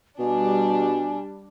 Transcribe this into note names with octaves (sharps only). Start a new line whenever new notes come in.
B2 G3 D4 G#5